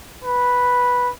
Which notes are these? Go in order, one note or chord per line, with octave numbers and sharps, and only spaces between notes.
B4